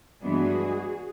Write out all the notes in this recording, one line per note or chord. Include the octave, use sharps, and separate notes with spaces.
G2 E3 G#3 B3 D4 F#4 G#4